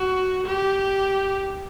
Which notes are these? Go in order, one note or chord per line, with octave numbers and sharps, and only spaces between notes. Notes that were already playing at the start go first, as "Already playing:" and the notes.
Already playing: F#4
G4